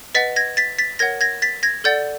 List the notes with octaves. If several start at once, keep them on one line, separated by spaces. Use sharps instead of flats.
B4 D#5 F#5 A6 B6
G#6 A#6
A6 B6
A6 B6
A#4 C#5 F#5 G#6 A#6
G#6 A#6
A6 B6
G#6 A#6
A4 D5 F#5 G6 A6